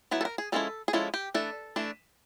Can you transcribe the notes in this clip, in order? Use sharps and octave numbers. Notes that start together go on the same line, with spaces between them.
F#3 B3 E4 B4
A4
A#4
G#4
F3 G#3 C#4 E4 A4
G#4
F3 G#3 C#4 E4 A4
G4
E3 A3 D4 A4
E3 A3 D4